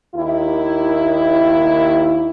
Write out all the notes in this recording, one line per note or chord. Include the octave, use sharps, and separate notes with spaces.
D#2 E4